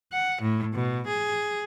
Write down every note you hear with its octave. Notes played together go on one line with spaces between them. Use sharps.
F#5
A2
B2
G#4